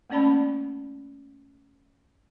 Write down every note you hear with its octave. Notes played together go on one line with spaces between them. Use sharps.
A3 A#3 C#4 D5 A5 B5